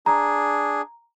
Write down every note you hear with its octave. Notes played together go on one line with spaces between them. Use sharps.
D4 G#4 A#5